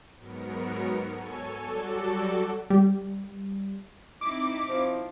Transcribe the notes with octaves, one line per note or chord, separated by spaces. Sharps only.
G#2 F#3 B3 A#4 C#7
A4 C#5 G#5
F#3 G3 F#4 A4 D5
G3
C4 D#4 E4 D6
F3